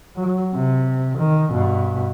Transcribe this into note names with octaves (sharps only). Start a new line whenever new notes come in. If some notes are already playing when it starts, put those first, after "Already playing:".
F#3
C3
D#3
G2 B2